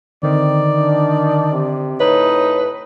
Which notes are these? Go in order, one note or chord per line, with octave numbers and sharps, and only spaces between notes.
D3 D#3 C4 D5
D4
C3
A2 D#4 B4 C#5